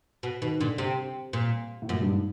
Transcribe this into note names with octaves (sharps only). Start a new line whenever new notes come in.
B2
B2 D#3
A#2 D3
C3
A#2
A2
F#2 A#2
G2
G#2